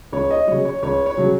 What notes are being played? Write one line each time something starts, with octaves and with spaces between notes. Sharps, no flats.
C#2 C#5
D#5
C#3 F#3 C#5
C#5
C#2 C#5
C#5
C#3 F#3